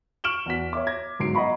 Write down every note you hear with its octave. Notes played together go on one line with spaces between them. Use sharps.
C#6 F6 D7 E7 F#7 G7
E2 F#4 B6
C#5 E5 D6
G#6 A#6
G1 G#2 F#3 C7 D7
D#5 F#5 A#5 B5 C#6